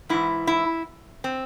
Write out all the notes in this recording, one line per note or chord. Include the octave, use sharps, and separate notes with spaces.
G#2 E3 E4
E4
C4